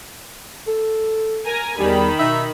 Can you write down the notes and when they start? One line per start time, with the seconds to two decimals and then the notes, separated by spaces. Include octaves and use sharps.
0.67 A4
1.46 A#4 G#5 A#5
1.79 E2 D#3 G3 B5
2.19 B2 D#4 E5